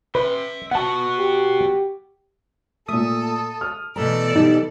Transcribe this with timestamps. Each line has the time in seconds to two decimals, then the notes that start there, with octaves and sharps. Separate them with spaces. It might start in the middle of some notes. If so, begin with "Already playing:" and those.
0.15 B4 E5 C6
0.71 B3 F#4 F#5 A5
1.19 G4
2.88 A#2 A3 A4 E5 D#6
3.61 F6
3.96 B2 E3 A3 A4 D5 A#5
4.36 B2 G3 D#4